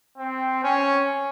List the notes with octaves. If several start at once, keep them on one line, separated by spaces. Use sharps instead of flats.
C4
C#4